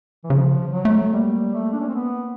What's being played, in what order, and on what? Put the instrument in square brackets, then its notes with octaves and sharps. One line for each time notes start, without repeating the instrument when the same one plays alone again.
[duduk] E3
[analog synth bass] C#3 [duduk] F3
[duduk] F3
F#3
[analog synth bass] A3
[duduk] G3 [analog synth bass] A#3
[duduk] A3
D4
C#4
C4
B3